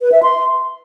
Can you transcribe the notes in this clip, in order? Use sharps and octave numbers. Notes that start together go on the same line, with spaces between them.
B4
E5
C6